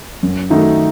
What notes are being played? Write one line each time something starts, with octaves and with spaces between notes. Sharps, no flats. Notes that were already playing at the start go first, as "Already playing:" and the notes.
F#2
D#3 A3 D#4 F#4